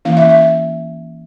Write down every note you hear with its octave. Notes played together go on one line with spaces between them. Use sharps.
E3 A#3 C#4 E4 F5
E5
E5